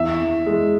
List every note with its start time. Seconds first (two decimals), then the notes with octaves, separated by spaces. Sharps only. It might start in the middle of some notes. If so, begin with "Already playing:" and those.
Already playing: E2 E5
0.20 E2
0.46 G#3